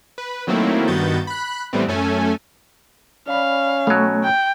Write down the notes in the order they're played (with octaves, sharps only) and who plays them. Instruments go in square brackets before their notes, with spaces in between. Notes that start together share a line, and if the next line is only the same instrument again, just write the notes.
[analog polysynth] B4
D#3 F#3 A3 A#3 C4 E4
G2 D#3 B3 F#4 G6 A6
B5 F#6
A2 E3 G3 A3 B3 C4
F#2 A3 C#4 A4 G#5
[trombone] C#4 [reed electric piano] D5 B5 [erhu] F5
[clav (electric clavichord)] B2 F#3 [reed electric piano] A3
[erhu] G5